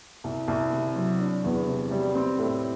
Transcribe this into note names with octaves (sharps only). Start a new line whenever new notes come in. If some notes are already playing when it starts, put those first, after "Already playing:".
C2
C2
C3
F#3
D4
E2
C3
G3
C4
A2